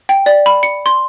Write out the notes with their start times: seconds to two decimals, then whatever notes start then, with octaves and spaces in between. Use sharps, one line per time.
0.09 G5
0.26 D5
0.46 B5
0.63 C#7
0.86 C6